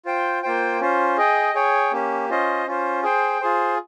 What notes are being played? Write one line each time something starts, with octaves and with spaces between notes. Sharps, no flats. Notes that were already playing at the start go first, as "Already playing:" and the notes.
F4 C5 G5
A#3 F4 C5 G5
C#4 F4 C5
G#4 D#5 G5
G#4 C#5 G5
A#3 C#4 G4
C#4 F4 C5 D#5
C#4 F4 C5
G#4 C5 G5
F4 G#4 C5